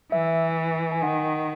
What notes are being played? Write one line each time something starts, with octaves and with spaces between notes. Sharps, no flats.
E3 E5
G#5
D#3 F#5